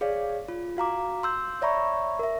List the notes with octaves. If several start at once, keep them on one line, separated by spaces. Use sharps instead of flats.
G#4 C#5 D5 F5
F4
F#4 F5 A#5 D6
C6 E6 G6
C#5 D5 E5 A#5 B5 C#6
A#4 E5